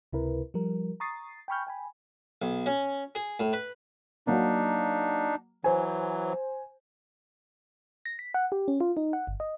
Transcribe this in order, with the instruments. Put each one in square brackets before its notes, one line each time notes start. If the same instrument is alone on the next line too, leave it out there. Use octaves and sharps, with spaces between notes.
[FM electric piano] C#2 C3 E4 A#4 B4
F3 G3 A#4
A#5 C#6 D#6 A6 C7
G5 G#5 B5 C#6 F6 G6
G5 G#5 B5
[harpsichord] B1
C#4
G#4
A2
B4
[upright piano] F#3 A#3 [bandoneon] D4 D#4
[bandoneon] E3 F#3 [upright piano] C5 G#5
[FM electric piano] A#6
B6
F#5
G4
C#4
F4
D#4
F#5
G1
D#5